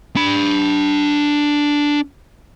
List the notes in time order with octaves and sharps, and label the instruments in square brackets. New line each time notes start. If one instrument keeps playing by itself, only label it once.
[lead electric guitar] D4 B5